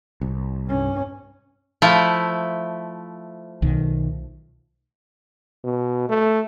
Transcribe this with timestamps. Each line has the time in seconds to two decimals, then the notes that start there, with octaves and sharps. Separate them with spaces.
0.21 C2
0.66 G2 C#4
1.82 F3 A3 E4
3.62 B1 D#3
5.64 B2
6.09 A3